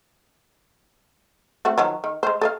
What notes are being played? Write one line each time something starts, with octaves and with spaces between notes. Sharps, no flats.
A3 C4 F#4
D#3 F3 F#3
D#3
G#3 C5
A4 D#5 F5